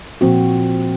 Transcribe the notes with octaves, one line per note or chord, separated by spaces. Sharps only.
A#2 F3 C4 F#4